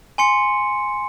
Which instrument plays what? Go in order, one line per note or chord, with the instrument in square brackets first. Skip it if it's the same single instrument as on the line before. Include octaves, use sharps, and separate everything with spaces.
[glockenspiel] G#5 C6 C#7